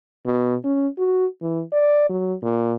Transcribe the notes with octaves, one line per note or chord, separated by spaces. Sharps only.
B2
C#4
F#4
E3
D5
F#3
A#2